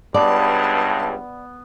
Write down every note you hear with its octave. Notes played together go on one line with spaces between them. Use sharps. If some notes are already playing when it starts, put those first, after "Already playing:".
C#2 G2 B3 D5 A5